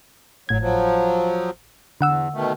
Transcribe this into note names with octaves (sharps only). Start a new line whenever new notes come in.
G#1 A2 F#3 G#6
F3 F#3
E2 D3 F#5 E6
B2 D#3 A3